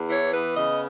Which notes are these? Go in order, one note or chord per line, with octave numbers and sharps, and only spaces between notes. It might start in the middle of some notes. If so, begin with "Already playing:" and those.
Already playing: E2
E3 C#5
B3 B4
C#3 D#5